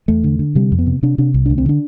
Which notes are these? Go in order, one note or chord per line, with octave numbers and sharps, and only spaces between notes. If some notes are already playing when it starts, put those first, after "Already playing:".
E2 A3
D3
D3
C3 G3
F2
B3
C3
C3 D4
C3 D4
C2
D2 D4
C4
D3 D4